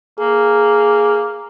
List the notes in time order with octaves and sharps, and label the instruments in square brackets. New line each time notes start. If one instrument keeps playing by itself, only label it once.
[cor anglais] A#3 [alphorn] G#4